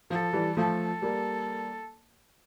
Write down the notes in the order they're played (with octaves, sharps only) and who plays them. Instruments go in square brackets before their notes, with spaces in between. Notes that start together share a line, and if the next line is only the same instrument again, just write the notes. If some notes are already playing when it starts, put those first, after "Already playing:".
[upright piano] F3 [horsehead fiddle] A4
[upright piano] E3 G3
[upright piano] F3 A3 [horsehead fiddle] A4
[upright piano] G3 A#3